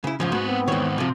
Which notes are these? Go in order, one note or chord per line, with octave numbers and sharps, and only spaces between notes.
C#3 E4
E2 G#2 C#3 F3
G#2 A#3 F#4 B4
B3 C4
E2 G#2 D#3 C#5
G#2 C3 F3